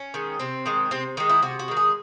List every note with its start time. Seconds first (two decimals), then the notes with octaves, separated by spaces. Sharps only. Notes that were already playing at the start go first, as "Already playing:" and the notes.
Already playing: C#4
0.14 D#3 G#3
0.39 C3 C4
0.66 D#3 G#3
0.91 C3 C4
1.17 D#3 G#3 D#4
1.29 E4
1.42 C3 F#4
1.59 F#4
1.68 D#3 G#3
1.77 G#4